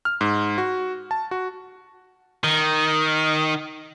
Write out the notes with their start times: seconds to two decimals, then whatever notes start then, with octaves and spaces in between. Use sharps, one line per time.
0.05 F6
0.21 G#2
0.58 F#4
1.11 A5
1.31 F#4
2.44 D#3